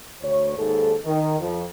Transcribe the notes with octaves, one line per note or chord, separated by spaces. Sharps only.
D2 C#5
D#2 G#2 A4
D#3
F2 F3